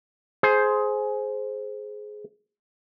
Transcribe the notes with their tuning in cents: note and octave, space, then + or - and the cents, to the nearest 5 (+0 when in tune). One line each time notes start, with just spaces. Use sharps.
G#4 +20 C5 +0